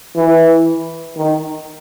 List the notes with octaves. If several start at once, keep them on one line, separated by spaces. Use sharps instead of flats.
E3
D#3